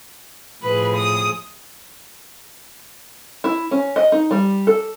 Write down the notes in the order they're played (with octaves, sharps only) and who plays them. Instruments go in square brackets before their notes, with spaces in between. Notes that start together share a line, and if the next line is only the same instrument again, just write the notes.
[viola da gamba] A2 F3 G#4 [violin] B4
[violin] D#6
[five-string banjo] E4
C#4
D#5
D#4
G3
A4